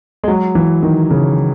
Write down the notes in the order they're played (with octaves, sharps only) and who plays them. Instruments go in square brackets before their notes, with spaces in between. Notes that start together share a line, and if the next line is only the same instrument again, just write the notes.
[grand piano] G#3
F#3
E3
D#3
C#3